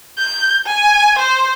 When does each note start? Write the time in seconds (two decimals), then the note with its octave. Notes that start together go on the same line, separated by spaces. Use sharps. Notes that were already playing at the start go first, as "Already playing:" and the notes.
0.18 G6
0.66 G#5
1.18 C5